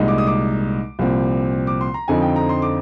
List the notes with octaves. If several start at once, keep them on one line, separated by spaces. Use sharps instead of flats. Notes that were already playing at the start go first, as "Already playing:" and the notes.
Already playing: C2 A#2 G#3 D#4
D6
D#6
D6
C2 A#2 F3 C4
D6
C6
A#5
F2 D3 F3 C4 D#4 G#5
G5
A#5
C6
D6